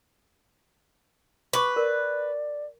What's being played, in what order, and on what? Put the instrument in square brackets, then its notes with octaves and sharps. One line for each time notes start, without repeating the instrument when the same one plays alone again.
[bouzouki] B4 [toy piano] C#6 D6
[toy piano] A#4 [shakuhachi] D5